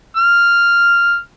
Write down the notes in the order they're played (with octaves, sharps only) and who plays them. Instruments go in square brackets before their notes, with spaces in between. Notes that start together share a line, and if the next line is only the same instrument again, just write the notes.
[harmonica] F6